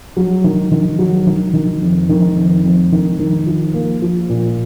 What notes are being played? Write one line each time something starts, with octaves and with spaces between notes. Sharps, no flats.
F#3
D#3
D#3
F#3
D#3
D#3
F2
D#3
F2
F2
D#3
D#3
F3
A#3
F3
A#2